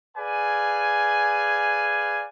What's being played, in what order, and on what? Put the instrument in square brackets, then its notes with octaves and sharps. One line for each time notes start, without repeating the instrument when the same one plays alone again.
[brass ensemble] G#4 B4 D5 F5 G#5